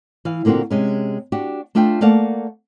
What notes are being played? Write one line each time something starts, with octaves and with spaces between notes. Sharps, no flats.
E3 F5
A#2 D3 A#3 C4 F#4
C3 G#3 C#4
D4 F#4 G4
A3 D4 F4 E5 G5
A3 A#3 D5 F5 F#5 A5